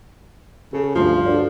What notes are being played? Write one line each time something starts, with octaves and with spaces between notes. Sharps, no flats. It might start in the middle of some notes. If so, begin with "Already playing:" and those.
C#3 A4
D2 G2 F3
D4 F#4 A4